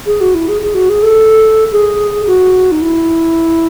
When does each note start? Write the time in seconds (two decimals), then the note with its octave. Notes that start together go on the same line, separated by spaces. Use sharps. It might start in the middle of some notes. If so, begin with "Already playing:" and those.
0.06 G#4
0.21 F#4
0.34 E4
0.48 G#4
0.62 G#4
0.75 F#4
0.89 G#4
1.03 A4
1.72 G#4
2.27 F#4
2.71 D#4
2.81 E4